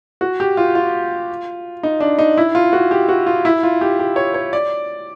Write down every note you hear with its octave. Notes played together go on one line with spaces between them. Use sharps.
F#4
G4
F4
F4
D#4
D4
D#4
E4
F4
F#4
G4
F#4
F4
E4
F4
G4
G4
C#5
C#5
D5